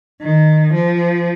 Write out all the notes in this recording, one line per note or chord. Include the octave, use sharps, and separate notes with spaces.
D#3
F3